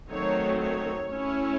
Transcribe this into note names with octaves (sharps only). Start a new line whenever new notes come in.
D#3 F#3 A3 C4 D#4 C#5
C#5
A3 C#4 E4 C#5